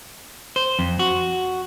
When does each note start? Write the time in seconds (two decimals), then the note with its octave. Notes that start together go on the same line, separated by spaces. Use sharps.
0.56 C5
0.79 F2
0.99 F#4